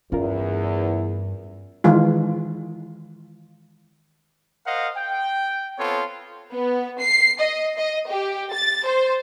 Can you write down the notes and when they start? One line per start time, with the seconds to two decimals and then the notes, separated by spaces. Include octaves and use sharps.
0.12 E2 G2 C#4 F4 A#4
1.84 D#3 E3 G#3 F4
4.66 A#4 C5 D#5 F5 F#5
4.97 G5
5.78 B3 C4 F4 A4 C#5
6.53 B3
7.00 C7
7.40 D#5
7.78 D#5
8.09 G4
8.53 A6
8.85 C5